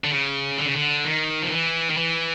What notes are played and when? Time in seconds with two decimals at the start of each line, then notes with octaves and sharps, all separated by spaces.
0.04 D3
0.11 C#3
0.58 D3
0.66 C#3
0.75 D3
1.05 D#3
1.42 F3
1.51 E3
1.90 D#3
1.97 E3